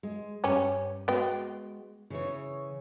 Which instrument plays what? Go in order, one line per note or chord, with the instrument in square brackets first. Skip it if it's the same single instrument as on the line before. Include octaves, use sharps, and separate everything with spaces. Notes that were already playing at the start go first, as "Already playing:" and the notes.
[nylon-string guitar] G#3
[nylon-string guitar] G2 [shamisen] C#4 G4
[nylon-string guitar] G#3 F#4 [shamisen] B3 G5
[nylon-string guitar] C#3 E3 C#5